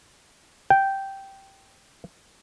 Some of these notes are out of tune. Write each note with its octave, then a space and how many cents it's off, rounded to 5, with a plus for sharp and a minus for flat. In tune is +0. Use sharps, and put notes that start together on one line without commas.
G5 -5